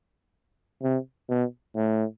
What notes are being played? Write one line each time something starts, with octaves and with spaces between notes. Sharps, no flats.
C3
B2
A2